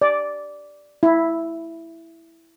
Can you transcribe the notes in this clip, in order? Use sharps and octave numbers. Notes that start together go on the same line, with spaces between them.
D5
E4